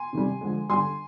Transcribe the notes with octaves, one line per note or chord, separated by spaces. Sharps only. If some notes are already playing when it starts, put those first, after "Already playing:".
Already playing: G#5 C6
C3 D#3 G3
D3 F3 G#3
D3 G3 G#5 C6